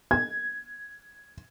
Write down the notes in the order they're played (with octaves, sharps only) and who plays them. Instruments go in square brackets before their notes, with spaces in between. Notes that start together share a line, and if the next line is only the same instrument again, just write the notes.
[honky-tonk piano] G#6